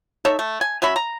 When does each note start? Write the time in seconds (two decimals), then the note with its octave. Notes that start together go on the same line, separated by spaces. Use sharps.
0.25 D#4 A4 C#5 E5
0.39 A3
0.61 G#5
0.82 F#3 C#4 E5 B5
0.96 A#5